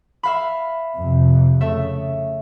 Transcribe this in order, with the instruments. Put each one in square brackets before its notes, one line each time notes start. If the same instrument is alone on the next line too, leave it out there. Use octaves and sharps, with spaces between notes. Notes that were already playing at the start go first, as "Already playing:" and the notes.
[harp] E5 F5 B5
[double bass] F2 C3
[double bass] C#3 [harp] A3 E5